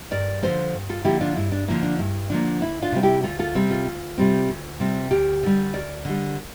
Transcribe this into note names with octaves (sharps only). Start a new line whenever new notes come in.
G2 A#4 D5
D3 F3 A#3 A4 C5
G2
F4 A4
D3 F3 A#3 E4 G4
D4 F4
G2 E4
D4
D3 F3 A#3 E4
D4
G2 E4
D3 F3 A#3 D4
D2 E4
D4 F4
C3 G3 C4
E4 G4
D2 F4 A4
F4 A4
C3 G3 C4
F4 A4
D2
C3 G3 C4
D2
C3 G3 C4
D2 G4 A#4
D3 G3
D2 A#4 D5
D3 G3